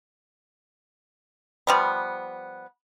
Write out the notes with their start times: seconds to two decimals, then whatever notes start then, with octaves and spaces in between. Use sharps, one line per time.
1.67 F3 G3 B3